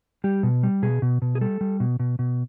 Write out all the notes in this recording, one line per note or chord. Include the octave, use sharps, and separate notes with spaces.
G3 G4
B2
G3
B2 G#4
B2
B2
G#4
G3 A4
G3
B2
B2
B2